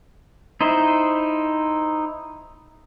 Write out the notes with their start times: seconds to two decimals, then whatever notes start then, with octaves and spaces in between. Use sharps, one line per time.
0.61 D#4 E4 C5